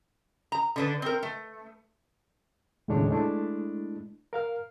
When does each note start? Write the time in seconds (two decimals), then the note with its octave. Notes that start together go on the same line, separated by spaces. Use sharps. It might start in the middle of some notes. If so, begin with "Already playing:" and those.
0.52 A#5
0.76 D3 D4 B4
1.02 C4 A#4
1.23 A3
2.88 D#2 A2 C#3 G#3 D4 C#5
3.10 G#3 A3 D4 E4
4.33 A#4 F5 F6